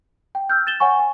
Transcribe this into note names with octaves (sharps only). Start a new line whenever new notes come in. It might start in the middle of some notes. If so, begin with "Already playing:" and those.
G5
E6 F6 G6
A6 E7 G7
C#5 F#5 G#5 C#6
G#5